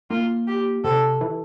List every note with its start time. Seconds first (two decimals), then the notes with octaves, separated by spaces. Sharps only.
0.10 A#3 F4
0.47 G4
0.84 C3 A4
1.21 E3